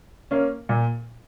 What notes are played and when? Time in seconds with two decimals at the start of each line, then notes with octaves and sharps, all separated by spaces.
0.31 A#3 C#4
0.69 A#2